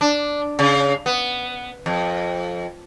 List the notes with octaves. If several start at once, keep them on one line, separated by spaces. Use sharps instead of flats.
D4
C#3
B3
F2